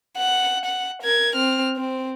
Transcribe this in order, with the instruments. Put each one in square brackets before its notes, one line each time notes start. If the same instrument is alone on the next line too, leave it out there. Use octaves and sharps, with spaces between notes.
[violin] F#5
F#5
A#4 G#6
C4 F6
C4